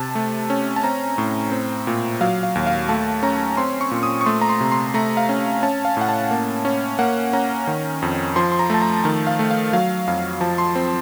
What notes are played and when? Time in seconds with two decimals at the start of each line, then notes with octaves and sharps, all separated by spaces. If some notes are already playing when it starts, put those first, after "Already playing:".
Already playing: C3 A5
0.15 A3
0.50 C#4
0.76 A5
0.84 C4 A#5
1.18 A2
1.52 C4
1.87 A#2
2.21 F#3 F5
2.43 F5
2.55 D#2
2.67 F5
2.89 A3 A5
3.23 C#4 A#5
3.57 C4 C6
3.81 C#6
3.91 A#2
4.03 D#6
4.21 C#6
4.26 A3 C6
4.41 A#5
4.49 C6
4.61 C3
4.72 C6
4.94 A3 A#5
5.17 F5
5.29 C#4
5.63 C#4 A5
5.85 F5
5.97 A2 F#5
6.09 A5
6.31 A#3
6.65 C#4
6.99 A#3 F#5
7.33 C#4 A#5
7.67 D#3
8.02 F2
8.36 F3 C6
8.52 C6
8.59 A#5
8.70 A3 A5
8.82 A#5
9.04 D#3 A5
9.27 F5
9.39 A3
9.51 F5
9.73 F#3 F5
10.08 F2 F5
10.41 F3 A5
10.58 C6
10.76 C4